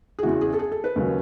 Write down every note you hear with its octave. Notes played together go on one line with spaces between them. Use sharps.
G#4
E2 C#3 E3 F#4
G#4
A4
G#4
A4
B4
D#2 C#3 F#3